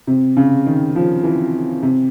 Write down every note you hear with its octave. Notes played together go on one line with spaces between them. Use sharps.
C3
C#3
D#3
F3
E3
C3